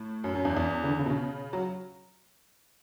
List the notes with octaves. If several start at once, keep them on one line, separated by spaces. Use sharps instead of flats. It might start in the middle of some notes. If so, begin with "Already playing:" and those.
Already playing: A2
F#2
F#2
E2
E2
C#3
D3
C#3
B2
C#3
F#3